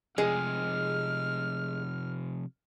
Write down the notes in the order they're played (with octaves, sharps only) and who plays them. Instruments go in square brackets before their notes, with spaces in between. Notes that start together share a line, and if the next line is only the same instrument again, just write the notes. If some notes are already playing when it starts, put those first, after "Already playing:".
[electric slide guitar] C3 F3 [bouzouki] G#3 [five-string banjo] G#4 [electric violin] F6